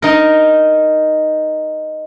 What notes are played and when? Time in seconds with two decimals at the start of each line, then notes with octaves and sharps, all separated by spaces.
0.02 D#4 A#4